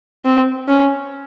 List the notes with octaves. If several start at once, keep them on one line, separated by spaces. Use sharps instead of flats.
C4
C#4